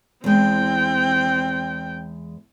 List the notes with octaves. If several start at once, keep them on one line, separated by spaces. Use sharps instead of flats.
E2 G#3 C4 G5